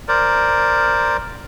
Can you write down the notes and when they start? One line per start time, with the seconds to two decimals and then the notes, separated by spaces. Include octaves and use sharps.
0.08 A#4 C5 D5